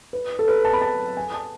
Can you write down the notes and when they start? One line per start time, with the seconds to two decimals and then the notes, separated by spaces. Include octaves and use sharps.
0.13 B4
0.39 A4
0.48 B4
0.65 A5
0.73 B5
0.81 A5
1.17 G#5
1.34 A5